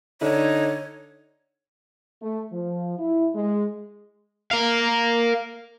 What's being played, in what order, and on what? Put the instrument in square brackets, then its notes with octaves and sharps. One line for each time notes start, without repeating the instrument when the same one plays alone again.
[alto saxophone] D3 [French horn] D#4 [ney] C#5
[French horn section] A3
F3
E4
G#3
[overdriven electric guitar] A#4 F5